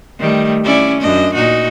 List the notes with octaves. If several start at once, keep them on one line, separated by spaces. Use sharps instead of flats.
D#3 G3 A3
C#4 E4 D5
F#2 D4 D#5
A#2 D#4 F#4